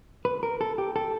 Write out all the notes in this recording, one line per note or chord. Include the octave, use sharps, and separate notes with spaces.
B4
A#4
A4
G4
A4